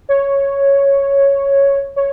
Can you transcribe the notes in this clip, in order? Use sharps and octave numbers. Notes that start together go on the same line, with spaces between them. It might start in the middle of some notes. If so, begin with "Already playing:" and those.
C#5
C#5